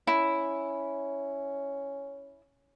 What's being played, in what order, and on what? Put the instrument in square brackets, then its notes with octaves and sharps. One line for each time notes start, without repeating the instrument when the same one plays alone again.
[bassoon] C#4 [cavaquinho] E4